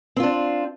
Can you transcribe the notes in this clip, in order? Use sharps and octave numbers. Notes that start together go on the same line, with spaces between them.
C4 D4 F4